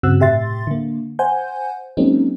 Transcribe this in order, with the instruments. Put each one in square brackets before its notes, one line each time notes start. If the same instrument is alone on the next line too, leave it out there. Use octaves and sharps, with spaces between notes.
[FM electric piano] G2 C#3 C4 F#4 E6 F#6
A2 C3 G4 E5 C6 A6
D3 A#3
C5 F#5 G#5 G6
F#3 G#3 A#3 C4 C#4 D#4